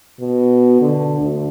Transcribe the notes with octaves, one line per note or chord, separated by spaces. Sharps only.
B2
D3
D2